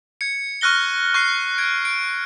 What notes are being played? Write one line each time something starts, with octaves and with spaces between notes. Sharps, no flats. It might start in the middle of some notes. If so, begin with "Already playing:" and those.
G#6 C#7
C#6 F6 F#6 A#6 G7
C#6 F#6 C7
G#6 D7
D7